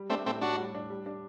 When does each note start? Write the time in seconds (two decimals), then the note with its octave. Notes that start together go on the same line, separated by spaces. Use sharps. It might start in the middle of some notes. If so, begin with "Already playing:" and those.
Already playing: G3
0.10 A3 C4 D4
0.26 A2 A3 C4
0.41 A2 D4 F#4
0.58 G3
0.75 D4
0.90 G3
1.06 D4